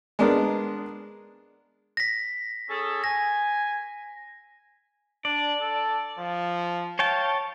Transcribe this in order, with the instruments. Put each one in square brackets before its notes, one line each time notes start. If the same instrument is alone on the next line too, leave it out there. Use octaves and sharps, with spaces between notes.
[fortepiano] G#3 B3 D4 A#4
[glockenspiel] A#6 B6
[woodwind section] C#4 G#4 A4
[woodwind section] G#5 [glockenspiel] A#6
[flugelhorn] D4 [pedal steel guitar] D5
[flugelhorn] A4
F3
[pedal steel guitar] C#5 G5 A5 [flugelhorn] F5